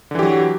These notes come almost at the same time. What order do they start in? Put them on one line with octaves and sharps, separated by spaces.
D3 E3 G4 F#3